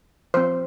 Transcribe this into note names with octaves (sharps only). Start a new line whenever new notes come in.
F3 C4 C5